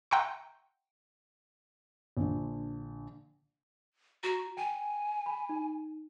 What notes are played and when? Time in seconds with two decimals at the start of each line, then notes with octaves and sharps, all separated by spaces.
0.11 E5 F#5 G5 A#5 C6 C#6
2.17 A#1 D3
4.24 F#4 A#5
4.57 G5 G#5
5.26 B5
5.49 D#4